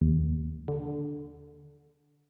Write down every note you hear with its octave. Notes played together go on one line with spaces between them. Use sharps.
D#2
D3